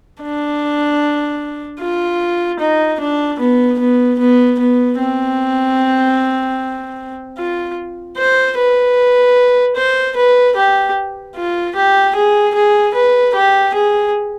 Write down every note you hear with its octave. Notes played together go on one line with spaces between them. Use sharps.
D4
F4
D#4
D4
B3
B3
B3
B3
C4
F4
C5
B4
C5
B4
G4
F4
G4
G#4
G#4
B4
G4
G#4